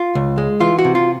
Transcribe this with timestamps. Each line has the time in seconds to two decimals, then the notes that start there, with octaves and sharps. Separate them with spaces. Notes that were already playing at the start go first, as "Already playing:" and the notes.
Already playing: F4
0.15 C#2
0.38 G#3
0.61 E3 F4
0.79 F#4
0.85 C3
0.95 F4